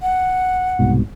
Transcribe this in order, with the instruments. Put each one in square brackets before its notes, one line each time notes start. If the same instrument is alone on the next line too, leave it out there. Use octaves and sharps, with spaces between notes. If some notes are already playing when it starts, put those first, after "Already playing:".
[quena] F#5
[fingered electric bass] C2 G#2 B2